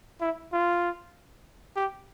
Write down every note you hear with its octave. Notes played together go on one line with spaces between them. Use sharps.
E4
F4
G4